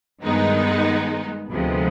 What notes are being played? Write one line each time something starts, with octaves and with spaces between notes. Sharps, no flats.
G2 D#3 G#3 B3 D#4
D2 C3 F3 G#3 B3